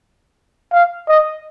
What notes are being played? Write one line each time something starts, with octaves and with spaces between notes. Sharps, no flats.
F5
D#5